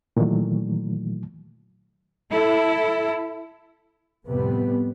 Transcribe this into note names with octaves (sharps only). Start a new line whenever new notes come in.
A#2 D#3 E3 F#3 A3
E4 A4
F2 A2 C3 G3 B3